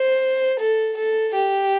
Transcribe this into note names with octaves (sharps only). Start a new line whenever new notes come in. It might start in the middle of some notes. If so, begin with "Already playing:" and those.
Already playing: C5
A4
A4
G4